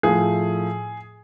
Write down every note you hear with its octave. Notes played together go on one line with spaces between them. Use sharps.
A2 F3 A3 G#4